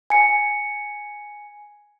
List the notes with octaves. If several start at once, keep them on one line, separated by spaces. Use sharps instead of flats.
G#5 C#7